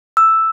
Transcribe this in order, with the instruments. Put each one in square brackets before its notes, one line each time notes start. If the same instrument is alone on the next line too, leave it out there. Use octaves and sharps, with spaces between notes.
[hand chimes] E6